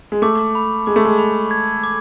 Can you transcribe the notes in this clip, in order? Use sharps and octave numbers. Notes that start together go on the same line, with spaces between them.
G#3
A3 D6
B5
G#3 D6
A3
G#3
B5
G#6
D6